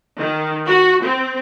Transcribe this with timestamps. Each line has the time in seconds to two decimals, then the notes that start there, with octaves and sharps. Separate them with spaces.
0.18 D#3
0.67 F#4
1.04 C4